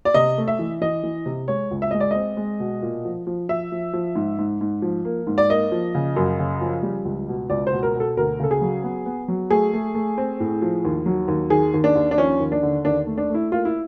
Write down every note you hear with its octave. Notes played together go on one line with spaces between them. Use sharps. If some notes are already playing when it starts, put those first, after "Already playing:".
D5
C3 D#5
A3
E5
E3
E3 D#5
E3
C3
G#3 C#5
C#2
E5
G#3 D#5
D5
C4 D#5
G#3
B2
A#2
F3
F3
F3 E5
F3
F3
G#2
G#2
G#2
F3
A#3
G#2
D5
A#3 D#5
F3
C#3
F#2
C#3
F3
G3
C#2
B2
C#2 D5
C5
B2
A#4
B2
A4
D2 A#4
C#3 A4
G#4
F#3
B3
B3
F#3
A3 G#4
A3
A3
C4
A2
F3
D#2
F#3
D#2
D#3 G#4
D#2
D4
D#2
D4
F3 C#4
D#2
D4
D3
D#2 D4
A3
D4
A3 E4
A#3 F4
E4